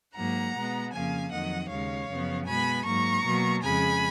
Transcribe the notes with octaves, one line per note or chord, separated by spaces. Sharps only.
G#2 F#3 A#3 F#5 A#5
B2 G#3 B3
F2 C#3 F3 A#3 F5 G#5
F2 D#3 F#3 D#5 F#5
D#2 C#3 G#3 C#5 F5
F#2 C#3 F3 B3
B2 G#3 B3 G#5 B5
G#2 F#3 A#3 A#5 C#6
B2 F#3 A#3
F2 C#3 G#3 G#5 B5